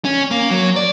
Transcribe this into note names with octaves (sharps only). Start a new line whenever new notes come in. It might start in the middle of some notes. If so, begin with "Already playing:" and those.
C#4
A#3
F#3
D5